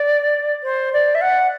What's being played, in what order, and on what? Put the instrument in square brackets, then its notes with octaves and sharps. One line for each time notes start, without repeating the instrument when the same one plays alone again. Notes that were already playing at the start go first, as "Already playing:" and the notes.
Already playing: [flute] D5
C5
D5
E5
F#5